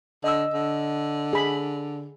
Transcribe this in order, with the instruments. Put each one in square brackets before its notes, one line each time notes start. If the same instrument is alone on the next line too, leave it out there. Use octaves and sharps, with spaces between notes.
[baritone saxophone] D3 [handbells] D#5 E6
[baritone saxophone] D3
[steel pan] G#4 B5